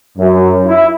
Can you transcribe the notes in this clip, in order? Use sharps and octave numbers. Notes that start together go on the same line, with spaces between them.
F#2
E4